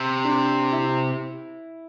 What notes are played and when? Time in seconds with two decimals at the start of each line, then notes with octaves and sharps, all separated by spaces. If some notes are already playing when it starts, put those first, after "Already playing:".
Already playing: C3
0.25 D4
0.72 E4